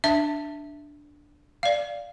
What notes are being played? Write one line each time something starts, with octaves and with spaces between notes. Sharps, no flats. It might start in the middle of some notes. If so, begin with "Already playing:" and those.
D4 E5
D5 F5